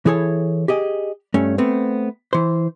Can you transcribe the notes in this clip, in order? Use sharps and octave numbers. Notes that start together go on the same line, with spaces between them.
E3 E4 G#4 A4 C#5
G4 G#4 D#5
G2 A3 C#4
A3 B3 C4
E3 C5